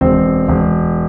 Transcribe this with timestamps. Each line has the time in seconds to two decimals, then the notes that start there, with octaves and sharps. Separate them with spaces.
0.01 E1 C4
0.48 E1